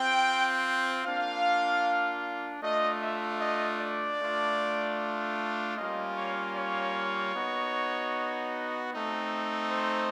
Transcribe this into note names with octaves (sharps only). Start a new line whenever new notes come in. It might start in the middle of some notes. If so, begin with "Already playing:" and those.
Already playing: C4 F4 G5
A#3 D4 F4 F5
A3 D4 F4 D#5
E5
D#5
D5
A3 D4 F4
G3 A#3 C#4 F4 D#5
C#5
C#5
B3 D#4 F#4
A3 C4 D#4
C5